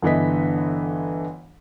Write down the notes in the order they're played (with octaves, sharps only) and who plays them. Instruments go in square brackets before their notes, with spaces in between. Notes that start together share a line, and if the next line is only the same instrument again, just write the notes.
[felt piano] G1 D3 E3 B3 D#5 B6